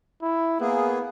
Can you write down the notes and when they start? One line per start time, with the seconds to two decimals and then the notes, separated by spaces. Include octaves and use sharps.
0.22 E4
0.61 A#3 B3 G#4